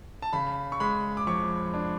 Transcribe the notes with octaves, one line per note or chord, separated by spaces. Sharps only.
A5
C#3 B5
C#6
G#3 B5
D6
F2 C#6
D4